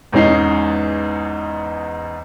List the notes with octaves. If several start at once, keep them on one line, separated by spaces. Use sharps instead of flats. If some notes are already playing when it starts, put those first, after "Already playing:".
E2 G#2 C#4 D#4 C7